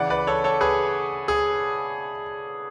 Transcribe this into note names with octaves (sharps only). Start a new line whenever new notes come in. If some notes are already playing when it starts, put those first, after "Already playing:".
Already playing: C#3 E3 D5 F#5
B4 D5
A4 C#5
A4 C#5
G#4 B4
G#4